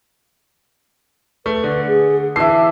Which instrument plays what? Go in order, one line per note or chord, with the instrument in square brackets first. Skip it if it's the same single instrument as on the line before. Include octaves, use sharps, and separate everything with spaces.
[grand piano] A3 [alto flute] B4
[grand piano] D3
[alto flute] G#4
[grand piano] E3 E6 C7 [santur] E5 D6 [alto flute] A5